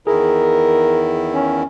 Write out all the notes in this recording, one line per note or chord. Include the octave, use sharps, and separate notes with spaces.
E2 D#3 E4 G#4 A#4
C#4